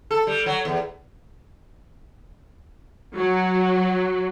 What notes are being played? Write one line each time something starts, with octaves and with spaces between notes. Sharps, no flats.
A4
G3
F#3
E2
F#3